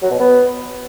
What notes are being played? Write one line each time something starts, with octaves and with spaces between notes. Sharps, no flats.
F#3
B2
B3